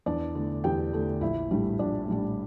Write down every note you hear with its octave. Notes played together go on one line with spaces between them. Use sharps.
E2 D4 D5
D3 A3
E2 G4 G5
D3 A3
A#1 E4 E5
A2 G3 D4
A#1 D4 D5
A2 G3 D4